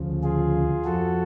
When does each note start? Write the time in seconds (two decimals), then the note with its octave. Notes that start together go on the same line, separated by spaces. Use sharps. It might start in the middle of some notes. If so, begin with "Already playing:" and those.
Already playing: D2 C#3 F3
0.23 F4 G#4
0.85 F2 F3 F#4 A4